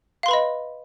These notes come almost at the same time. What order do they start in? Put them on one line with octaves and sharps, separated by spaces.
F5 C6 B4 B5 D#5